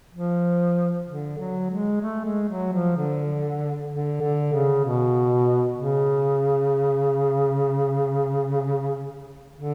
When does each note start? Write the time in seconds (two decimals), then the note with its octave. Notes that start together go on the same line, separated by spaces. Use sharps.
0.13 F3
1.07 D3
1.39 F#3
1.70 G#3
2.01 A3
2.25 G#3
2.49 F#3
2.72 F3
2.96 D3
3.90 D3
4.21 D3
4.53 C#3
4.84 B2
5.78 C#3
9.56 D3